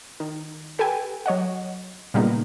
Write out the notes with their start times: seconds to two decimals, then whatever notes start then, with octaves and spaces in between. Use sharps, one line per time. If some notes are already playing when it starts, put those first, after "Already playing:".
0.20 D#3
0.79 G4 A4 B4 G5 G#5
1.26 F#3 C#5 D#5 F#5
2.14 A#2 C#3 G3 A#3 B3 D#4